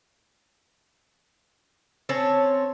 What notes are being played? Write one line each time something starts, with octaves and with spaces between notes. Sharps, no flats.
C4 C#4 C#5 A5